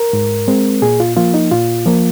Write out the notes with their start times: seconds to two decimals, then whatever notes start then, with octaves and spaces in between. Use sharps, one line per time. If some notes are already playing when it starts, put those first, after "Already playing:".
Already playing: A#4
0.13 G#2
0.48 G#3 C4
0.82 A#2 G#4
1.00 F4
1.16 F3 A#3 F4
1.34 D#4
1.51 A#2 F4
1.86 F3 A#3